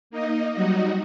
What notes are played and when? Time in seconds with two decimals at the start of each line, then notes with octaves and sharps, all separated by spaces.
0.10 A#3 D#4 D#5
0.54 F#3 G3 D#4 F#4 D#5